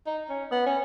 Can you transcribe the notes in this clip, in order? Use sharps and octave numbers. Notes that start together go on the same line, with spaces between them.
D#4
C#4
B3
C#4